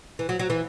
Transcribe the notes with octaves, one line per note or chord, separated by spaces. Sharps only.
E3
F#3
F#3
E3